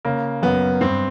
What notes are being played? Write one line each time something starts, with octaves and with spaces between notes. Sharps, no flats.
C#3 A#3
F#2 B3
G2 C4